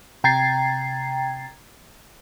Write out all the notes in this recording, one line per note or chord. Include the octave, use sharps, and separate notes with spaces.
C3 G5 A#5 G#6 A6 C7